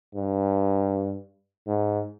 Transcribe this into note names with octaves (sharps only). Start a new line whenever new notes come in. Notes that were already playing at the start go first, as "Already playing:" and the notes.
G2
G#2